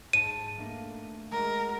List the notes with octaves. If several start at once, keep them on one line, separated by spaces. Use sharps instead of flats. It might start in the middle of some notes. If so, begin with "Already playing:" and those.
G#2 A5 D#7
A3 A#3 D4
G#3 F#4 A#4